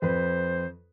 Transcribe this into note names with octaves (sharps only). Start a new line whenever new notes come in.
F2 B4 C5